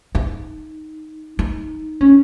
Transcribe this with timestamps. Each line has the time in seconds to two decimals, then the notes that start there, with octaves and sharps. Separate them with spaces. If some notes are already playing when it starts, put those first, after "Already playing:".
0.15 D#4
1.39 D#4
2.01 C#4